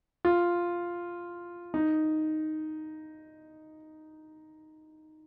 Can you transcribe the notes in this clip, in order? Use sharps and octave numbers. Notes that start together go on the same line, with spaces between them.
F4
D#4